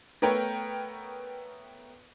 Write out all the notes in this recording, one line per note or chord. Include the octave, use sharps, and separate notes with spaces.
A3 B3 A#4 B4 C#5 G5